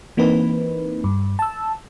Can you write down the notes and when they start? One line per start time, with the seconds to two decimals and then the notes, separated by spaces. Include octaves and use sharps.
0.17 E3 A#3 C4 D#4 B4
1.04 G2
1.39 A5 E6